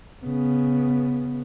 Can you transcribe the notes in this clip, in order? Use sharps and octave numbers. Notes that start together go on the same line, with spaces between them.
C#3 B3